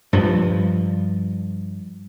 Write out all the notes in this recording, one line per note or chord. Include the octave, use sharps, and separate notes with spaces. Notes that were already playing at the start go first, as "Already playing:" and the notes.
G2 F3